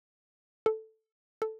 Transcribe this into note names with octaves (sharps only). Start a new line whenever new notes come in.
A4
A4